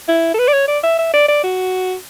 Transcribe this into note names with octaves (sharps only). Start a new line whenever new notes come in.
E4
A4
B4
D5
C#5
D5
E5
E5
D5
D5
F#4